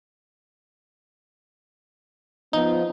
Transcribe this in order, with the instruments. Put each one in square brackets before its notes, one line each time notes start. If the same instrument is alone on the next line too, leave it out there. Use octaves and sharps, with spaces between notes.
[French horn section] F3 B3 [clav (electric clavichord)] D#4